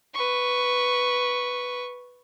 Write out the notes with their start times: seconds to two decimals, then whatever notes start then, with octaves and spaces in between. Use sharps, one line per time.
0.14 B4 C#6